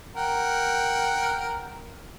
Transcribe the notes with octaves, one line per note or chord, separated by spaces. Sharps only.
A#4 F#5 G5